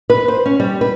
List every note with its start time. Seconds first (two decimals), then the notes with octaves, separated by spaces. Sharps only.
0.10 B4
0.28 C5
0.46 C#4
0.60 G3
0.81 B4